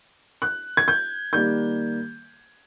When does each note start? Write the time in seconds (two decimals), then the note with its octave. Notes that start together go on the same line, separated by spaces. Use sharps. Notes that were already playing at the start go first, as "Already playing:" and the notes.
0.42 F#6
0.77 G#6
0.88 G6
1.33 D#3 G3 A#3 G6